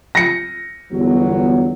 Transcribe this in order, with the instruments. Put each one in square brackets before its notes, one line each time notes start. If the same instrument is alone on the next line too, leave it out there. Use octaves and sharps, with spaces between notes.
[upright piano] A#6 C#7
[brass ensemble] G1 E2 F#3